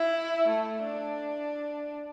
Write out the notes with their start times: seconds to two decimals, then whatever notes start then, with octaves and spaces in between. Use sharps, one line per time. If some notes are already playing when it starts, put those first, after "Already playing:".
Already playing: E4
0.48 A3
0.84 D4